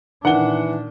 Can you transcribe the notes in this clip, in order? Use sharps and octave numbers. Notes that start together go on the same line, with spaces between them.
A#2 D#3 E3 D4 F#5 G7